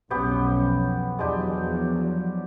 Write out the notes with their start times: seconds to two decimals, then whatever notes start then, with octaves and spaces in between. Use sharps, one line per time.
0.10 B1 F2 B3 C#4 G4
1.19 E2 F3 F#3 G#3 D4 G4